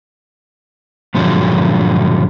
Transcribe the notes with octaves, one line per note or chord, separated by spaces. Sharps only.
G2 A#2 D3 F3 F#3 G#3